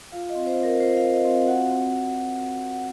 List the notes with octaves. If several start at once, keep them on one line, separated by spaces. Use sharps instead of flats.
F4 F5
D#5
C4
C5
C4
A#4
F4 C5
F5
F4
D#5
C4
F5
F#4 F#5
C4
C4
F#4
F#4
C4
F#5